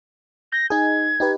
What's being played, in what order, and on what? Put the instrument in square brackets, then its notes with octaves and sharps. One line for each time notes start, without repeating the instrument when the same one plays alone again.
[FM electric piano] G6 [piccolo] A#6
[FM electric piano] D#4 G#4 [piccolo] G#6
[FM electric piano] D#4 G4 B4